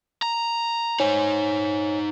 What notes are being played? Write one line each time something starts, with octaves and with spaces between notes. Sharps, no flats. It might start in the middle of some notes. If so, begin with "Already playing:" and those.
A#5
D#4 C5 C#5 G#5